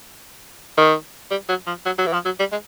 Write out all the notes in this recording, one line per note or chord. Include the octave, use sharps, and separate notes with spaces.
D#3
G3
F#3
F3
F#3
F#3
E3
F3
F#3
G3
G#3